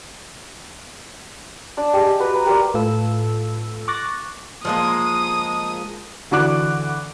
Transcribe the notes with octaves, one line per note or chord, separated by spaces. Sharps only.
D4 D5 A5
G4 G#4 D#5
G4
F#4 B4
B4 A#5
G4 A#4 C5 D5
A2 F4 A4 B4 E6
C#6 D6 F#6 A6 A#6
F3 G#3 A#3 D#6
D3 E3 F#4 D5 D6 F#6